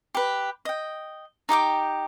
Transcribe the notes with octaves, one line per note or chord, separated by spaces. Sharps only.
G4 B4
D#5 G5
D#4 G4 G5 D6